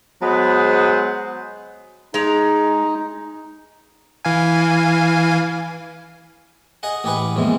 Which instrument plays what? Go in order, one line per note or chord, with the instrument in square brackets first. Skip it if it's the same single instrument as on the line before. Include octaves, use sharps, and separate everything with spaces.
[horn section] F#3 G#3 B3 G#4 C5
[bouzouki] G#3 A#5 [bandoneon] D#4
[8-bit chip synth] E3 F5 G#5
[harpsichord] G#4 D#5 F#5
A1 G4 G#4 B4 F#5
A#1 F2 B2 E3 G#3